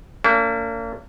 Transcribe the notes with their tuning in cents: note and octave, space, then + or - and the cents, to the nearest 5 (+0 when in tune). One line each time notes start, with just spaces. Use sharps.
A#3 -35 D4 -45